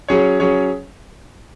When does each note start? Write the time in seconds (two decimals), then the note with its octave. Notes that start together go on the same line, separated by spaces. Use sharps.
0.08 F#3 C#4 G#4 C#5
0.40 F#3 C#4 G#4 C#5